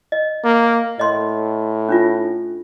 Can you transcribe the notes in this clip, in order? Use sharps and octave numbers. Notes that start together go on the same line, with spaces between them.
D#5
A#3
A2 D#5 C6
C#4 D4 F4